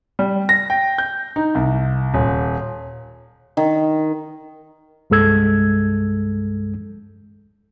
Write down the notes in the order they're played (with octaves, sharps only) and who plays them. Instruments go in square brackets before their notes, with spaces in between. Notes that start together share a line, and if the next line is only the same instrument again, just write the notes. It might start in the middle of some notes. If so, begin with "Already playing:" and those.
[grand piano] G3
A#6
G5
G6
D#4
C2
D#1
[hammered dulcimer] D#3
[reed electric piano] C2 G2 G#3 A4 E6 G#6